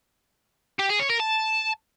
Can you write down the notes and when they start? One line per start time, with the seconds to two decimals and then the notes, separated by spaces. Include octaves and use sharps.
0.80 G4
0.90 G#4
1.00 C#5
1.10 A#4
1.20 A5